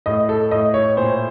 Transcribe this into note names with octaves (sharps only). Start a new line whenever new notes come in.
A2 D#5
A4
A2 D#5
C#5
A#2 C5